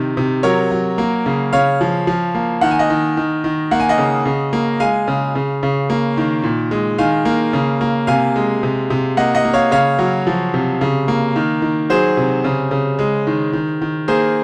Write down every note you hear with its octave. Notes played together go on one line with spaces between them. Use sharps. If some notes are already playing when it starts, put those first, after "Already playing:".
Already playing: C3 D#3
C3
F#3 A#4 C#5
F#3
A#3
C#3
C#3 C#5 F5
F3
F3
A#3
D#3 F#5
G#5
D#5 F#5
D#3
D#3
D#3
A#3 F#5
G#5
D#5 F#5
C#3
C#3
A#3
G#3 F5 G#5
C#3
C#3
C#3
A#3
D#3
A#2
G#3
D#3 F5 G#5
A#3
C#3
A#3
C3 F5 G#5
G#3
C3
C3
A#3 D#5 F#5
D#5 F#5
A#3
C#5 F5
C#3 C#5 F5
F#3
F3
C3
C#3
A#3
D#3
D#3
F#3 G#4 C5
C3
C#3
C#3
G#3
D#3
D#3
D#3
A#3 G#4 C5